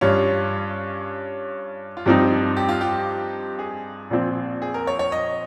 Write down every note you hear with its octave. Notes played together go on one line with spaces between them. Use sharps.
G2 G3 C#4 F4
F4
G2 F3 C4 D#4 G4
G4
F4
G4
G#4
A#1 A#2 F3 C4
G#4
A#4
C#5
C#5
D#5